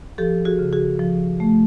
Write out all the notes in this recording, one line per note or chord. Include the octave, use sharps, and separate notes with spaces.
F3 G4 A4
F#4 G#4
C#3
F#4 G#4
F3
A3